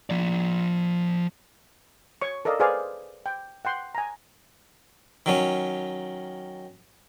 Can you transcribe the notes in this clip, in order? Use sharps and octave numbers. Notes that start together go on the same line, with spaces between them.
F3 D5
C#5 C#6
A4 A#4 D5 D#5 F5
G#4 B4 C5 D5 F5 G#5
G5
F#5 G5 C6
G#5 A#5
D#3 F#3 C#4